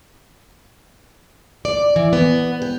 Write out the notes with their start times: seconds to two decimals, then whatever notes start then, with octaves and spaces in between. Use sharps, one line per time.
1.65 D5
1.96 E3
2.13 B3
2.62 G4